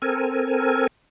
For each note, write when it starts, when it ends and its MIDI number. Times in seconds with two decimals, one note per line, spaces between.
0.02 0.87 60
0.02 0.87 69
0.02 0.87 70
0.02 0.87 80